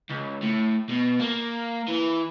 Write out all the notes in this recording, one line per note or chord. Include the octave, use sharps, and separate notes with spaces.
C#2
A2
B2
A#3
E3